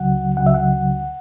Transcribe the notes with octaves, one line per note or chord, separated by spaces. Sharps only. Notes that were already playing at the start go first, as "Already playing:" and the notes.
Already playing: C#2 C#3 F#3 F#5
C#2 C#3 F#3 F#5
E5
F#5